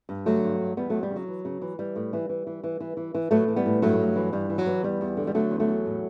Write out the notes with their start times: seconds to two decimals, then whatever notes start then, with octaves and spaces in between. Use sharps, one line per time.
0.09 G2
0.26 D3 F#3 A3
0.44 G2
0.61 G2
0.77 E2 G3 B3
0.90 E2 F#3 A3
1.03 G3
1.11 C#3
1.16 F#3
1.28 E3
1.45 C#3
1.62 E3
1.79 E3 G3
1.96 A2
2.13 E3
2.29 E3
2.47 E3
2.63 E3
2.80 E3
2.97 E3
3.14 E3
3.31 A2 F#3 A3
3.48 E3
3.56 G3 B3
3.66 A2
3.82 G2 F#3 A3
4.00 G2
4.16 E3
4.33 G2 G3
4.49 E3
4.58 F#3
4.66 E3
4.83 E2 G3
5.01 E2
5.17 D3
5.27 G3
5.34 D3 F#3 A3
5.51 E2
5.60 F#3 A3
5.68 E2
5.86 A2